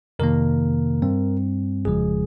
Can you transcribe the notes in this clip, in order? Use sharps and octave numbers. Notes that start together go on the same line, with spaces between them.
F2 C3 D#3 A#3 A#4
G2 G3 C4
G1 F2 C#3 F3 G#3 G#4